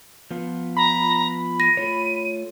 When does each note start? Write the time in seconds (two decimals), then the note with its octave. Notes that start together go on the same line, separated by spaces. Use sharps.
0.31 F3 B3 F4
0.77 A#5 B5
1.60 A#6 D#7
1.77 A3 F4 C#5